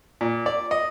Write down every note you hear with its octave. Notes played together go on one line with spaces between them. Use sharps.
A#2
D5
D#5